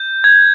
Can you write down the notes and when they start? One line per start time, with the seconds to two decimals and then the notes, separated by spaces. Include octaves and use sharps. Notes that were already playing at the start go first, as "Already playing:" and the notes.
Already playing: G6
0.24 G#6